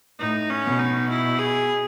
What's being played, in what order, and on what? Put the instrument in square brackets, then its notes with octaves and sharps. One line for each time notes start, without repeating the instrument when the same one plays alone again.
[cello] A2 [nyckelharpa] D#4
[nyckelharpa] C#4
[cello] B2
[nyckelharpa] D#4
E4
G#4